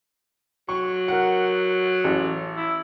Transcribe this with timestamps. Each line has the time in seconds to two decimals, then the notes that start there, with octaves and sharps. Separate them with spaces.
0.69 F#3 C#6
1.08 A#4 F#5
2.04 A1
2.57 E4